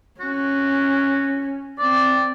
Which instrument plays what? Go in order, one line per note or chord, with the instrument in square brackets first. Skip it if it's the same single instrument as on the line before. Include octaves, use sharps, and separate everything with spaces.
[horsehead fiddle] C#4 [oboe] F#4
[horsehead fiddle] C4 [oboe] D5